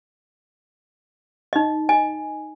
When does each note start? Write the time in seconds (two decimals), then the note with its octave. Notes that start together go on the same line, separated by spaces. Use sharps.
1.53 D#4 D#5
1.89 D#5 G#5